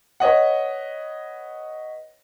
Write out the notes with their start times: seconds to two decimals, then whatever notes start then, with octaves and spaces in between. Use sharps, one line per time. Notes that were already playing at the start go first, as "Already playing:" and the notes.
0.20 B4 C#5 D#5 F#5